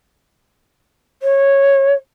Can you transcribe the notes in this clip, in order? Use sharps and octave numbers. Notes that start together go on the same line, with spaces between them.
C#5